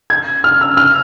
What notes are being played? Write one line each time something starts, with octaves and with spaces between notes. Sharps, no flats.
G#6
F6
E6
F6